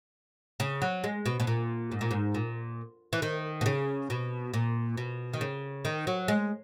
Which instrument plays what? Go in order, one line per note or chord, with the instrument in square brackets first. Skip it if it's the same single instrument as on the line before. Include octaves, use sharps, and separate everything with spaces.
[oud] C#3
F#3
G#3
B2
B2
A#2
G#2
A#2
G#2
A#2
E3
D#3
B2
C#3
B2
A#2
B2
D#3
C#3
D#3
F#3
G#3